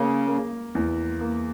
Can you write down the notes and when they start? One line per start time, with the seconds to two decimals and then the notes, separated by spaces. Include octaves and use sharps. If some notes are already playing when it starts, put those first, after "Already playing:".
Already playing: C#3 A#3
0.27 A#3
0.75 E2
1.21 A#3